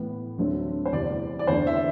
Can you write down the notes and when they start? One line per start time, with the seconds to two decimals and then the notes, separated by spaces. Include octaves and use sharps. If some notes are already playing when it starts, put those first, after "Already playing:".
Already playing: A2 E3 B3
0.38 D2 D3 F#3 A3 C4
0.86 C5
0.92 E2 C3 G3 D5
1.39 D5
1.47 E2 D3 A3 C5
1.67 E5